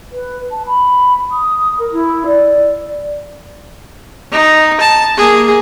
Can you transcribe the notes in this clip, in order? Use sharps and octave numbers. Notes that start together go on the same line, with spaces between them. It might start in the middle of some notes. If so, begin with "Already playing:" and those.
B4
A5
B5
D#6
A#4
E4
D5
D#4
A5
A#3 G#4